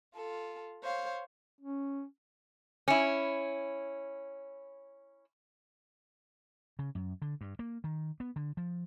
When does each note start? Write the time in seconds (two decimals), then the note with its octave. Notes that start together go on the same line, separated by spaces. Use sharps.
0.15 F4 A4
0.82 C5 C#5 F5
1.61 C#4
2.88 C#4 E4
6.79 C#3
6.95 F#2
7.22 D3
7.41 G2
7.59 A#3
7.84 D#3
8.20 B3
8.36 D3
8.57 F3